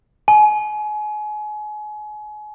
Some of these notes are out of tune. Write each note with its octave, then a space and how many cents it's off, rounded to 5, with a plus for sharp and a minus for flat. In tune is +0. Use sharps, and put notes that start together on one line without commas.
G#5 +30